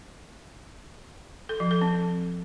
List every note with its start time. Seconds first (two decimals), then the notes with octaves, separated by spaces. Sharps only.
1.49 A4
1.60 F3
1.71 A4
1.82 C4